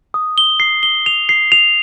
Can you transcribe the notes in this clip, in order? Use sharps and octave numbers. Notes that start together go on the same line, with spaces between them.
D#6
G7
C7
G7
F7
C7
F7